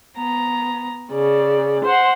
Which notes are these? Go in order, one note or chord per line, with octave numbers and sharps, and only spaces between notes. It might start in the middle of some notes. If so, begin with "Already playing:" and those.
B3 A#5
C#3 D5
C5 F#5 C6